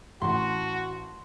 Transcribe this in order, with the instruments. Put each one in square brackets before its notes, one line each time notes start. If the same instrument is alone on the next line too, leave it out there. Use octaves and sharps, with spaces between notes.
[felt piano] A1 [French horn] F#4 [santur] A5 C6